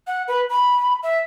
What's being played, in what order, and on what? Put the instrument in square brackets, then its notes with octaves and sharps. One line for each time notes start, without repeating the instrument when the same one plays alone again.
[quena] F#5
B4
B5
E5